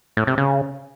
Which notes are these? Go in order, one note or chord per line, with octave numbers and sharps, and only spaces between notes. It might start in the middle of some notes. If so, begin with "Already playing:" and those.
A2
C3
C#3